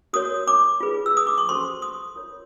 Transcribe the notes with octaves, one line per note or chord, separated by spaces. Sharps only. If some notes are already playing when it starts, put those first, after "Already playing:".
F#4 A#4 C#5 D#6
D6
F4 G#4 B4
E6
D#6
D6
C#6
C#4 F#4 A4 C5 C6
D#6
F4 A#4 C#5